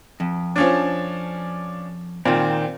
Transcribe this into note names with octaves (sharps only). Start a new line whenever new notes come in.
F2
F3 C#4 D4
A#2 D#3 C4